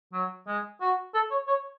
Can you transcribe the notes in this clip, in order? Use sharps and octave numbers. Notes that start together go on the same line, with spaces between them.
F#3
G#3
F#4
A4
C#5
C#5